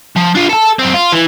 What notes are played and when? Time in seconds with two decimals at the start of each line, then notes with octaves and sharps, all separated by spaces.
0.16 F3
0.35 D4 F4
0.49 A4 A5
0.79 F#2 C4
0.94 F4
1.12 E3